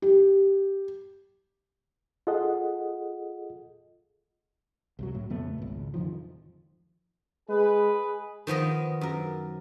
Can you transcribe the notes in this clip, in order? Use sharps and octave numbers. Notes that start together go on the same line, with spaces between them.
G4
F4 G#4 A4 D#5 F#5
C2 F#2 F#3
A2
F2 C#3 A3 B3
G#1 C#2
D1 F2 D#3 F3
G#3 G#4 B4
D#3 F3 B3 D#5
F#2 A#4